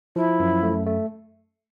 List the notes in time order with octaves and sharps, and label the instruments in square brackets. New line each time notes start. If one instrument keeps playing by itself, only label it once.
[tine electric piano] F3 [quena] E4
[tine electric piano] F#2
A3
A3